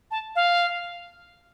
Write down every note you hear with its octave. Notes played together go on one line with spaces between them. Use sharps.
A5
F5